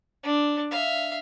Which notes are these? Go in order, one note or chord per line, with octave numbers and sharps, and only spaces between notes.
D4
E5 F5